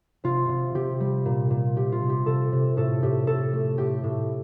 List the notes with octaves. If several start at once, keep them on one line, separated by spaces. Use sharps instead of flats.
C3 F4
C3
C3 G4
G3
A#2
A#2
C3 G4
F4
C3
G4
C3 A4
C3
A2 A4
A2 G4
A2 A4
A3
A2 G4
A2